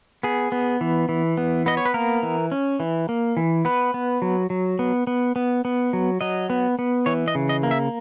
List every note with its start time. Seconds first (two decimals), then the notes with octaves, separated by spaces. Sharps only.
0.23 B3 G#4
0.52 B3
0.81 E3
1.09 E3
1.37 B3
1.66 B3 D#5
1.77 C#5
1.85 B4
1.94 A#3 A#4
2.23 E3
2.52 C#4
2.80 E3
3.09 A#3
3.37 E3
3.65 B3 B4
3.94 B3
4.22 F#3
4.50 F#3
4.79 B3
5.07 B3
5.36 B3
5.65 B3
5.93 F#3
6.21 F#3 D#5
6.50 B3
6.79 B3
7.06 E3 C#5
7.28 D#5
7.35 C#3
7.49 D#5
7.63 A#3
7.71 E5